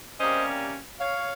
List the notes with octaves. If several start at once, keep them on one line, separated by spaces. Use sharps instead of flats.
C3 G3 A#3 C#4 C5 D#5
C#5 F5